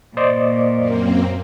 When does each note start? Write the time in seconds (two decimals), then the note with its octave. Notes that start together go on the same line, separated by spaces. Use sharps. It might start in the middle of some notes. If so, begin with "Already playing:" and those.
0.17 A#2 C5 D5 D#5
0.76 F#2 A#3 C4